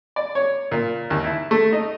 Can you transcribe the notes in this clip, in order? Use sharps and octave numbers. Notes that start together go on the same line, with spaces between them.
D5
C#5
A#2
D#2
E4
A3
D#4